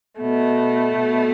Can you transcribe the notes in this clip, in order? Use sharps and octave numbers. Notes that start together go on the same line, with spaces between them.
B2 A3
B2